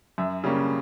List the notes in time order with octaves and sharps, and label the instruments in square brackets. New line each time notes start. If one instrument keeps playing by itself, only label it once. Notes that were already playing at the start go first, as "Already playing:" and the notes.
[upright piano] F#2 E5
C#3 G3 A#3 C#4